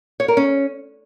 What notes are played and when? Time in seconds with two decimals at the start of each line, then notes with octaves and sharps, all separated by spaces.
0.20 C#5
0.28 A#4
0.37 C#4